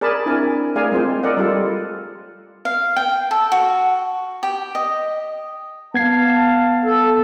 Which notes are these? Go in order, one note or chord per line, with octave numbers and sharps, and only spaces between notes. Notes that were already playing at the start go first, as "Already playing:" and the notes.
G#4 A#4 D5 A5 B5
C4 D4 E4 A#4 G#5
A3 G#4 A#4 D5 F5 G#5
G#3 C4 F4 C5
A4 A#4 D5 D#5 F#5
G3 F4 A4
F5
G5
A4
F#4
G4
D#5
B3 F5 F#5 A5 G#6 C7
A4